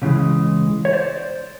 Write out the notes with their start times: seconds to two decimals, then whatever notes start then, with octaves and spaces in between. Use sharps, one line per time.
0.02 C#2 C#3 E3 G#3
0.85 C#5
0.93 C5 D5